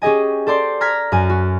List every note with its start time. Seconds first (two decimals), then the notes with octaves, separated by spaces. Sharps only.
0.02 C#4 G4 G#4 D#5 G#5
0.47 A4 C5 D5 C6
0.81 A#5 F6 G#6 A#6 B6
1.12 F#2 G#5
1.29 F#4